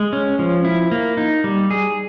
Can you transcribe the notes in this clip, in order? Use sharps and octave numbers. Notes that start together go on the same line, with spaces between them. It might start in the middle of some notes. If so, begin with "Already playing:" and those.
Already playing: G#3
C#4
F3
E4
A#3
D#4
G3
G#4